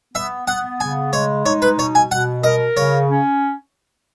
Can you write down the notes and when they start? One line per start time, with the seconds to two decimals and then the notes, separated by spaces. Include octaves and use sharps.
0.14 B3 E5
0.47 B3 F#5
0.80 C#3 G#5
1.13 G#3 C#5
1.45 D#4 C#5
1.62 B4
1.78 B2 C#5
1.95 G#5
2.11 B2 F#5
2.44 A#4 D#5
2.77 C#3 C#5
3.10 C#4